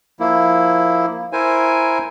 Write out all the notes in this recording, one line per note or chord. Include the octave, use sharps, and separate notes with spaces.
F3 A#3 E4
E4 A#4 C5 G#5